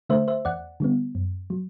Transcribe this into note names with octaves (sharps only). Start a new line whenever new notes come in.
D3 A3 C5 E5
C5 E5
E2 D5 F#5
D3 G3 B3
F#2
F#3